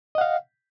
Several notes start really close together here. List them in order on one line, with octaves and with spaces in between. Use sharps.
D#5 F#5 F5